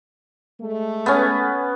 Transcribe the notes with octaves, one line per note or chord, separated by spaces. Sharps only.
G#3 A3
B3 C#4